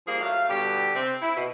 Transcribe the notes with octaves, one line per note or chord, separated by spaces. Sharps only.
F3 G3 A#3 D#4 G#4
F#3 A3 F5
B2 D3 G3 G4
C3 C4
E4
B2